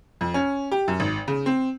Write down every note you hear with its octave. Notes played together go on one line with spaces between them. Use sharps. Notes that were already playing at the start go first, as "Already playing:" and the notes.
F2
C#4
G4
F#2
G#1
C#3
C4